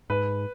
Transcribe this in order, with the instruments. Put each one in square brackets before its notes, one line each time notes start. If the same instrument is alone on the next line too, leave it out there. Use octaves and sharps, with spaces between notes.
[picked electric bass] G#2 [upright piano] B4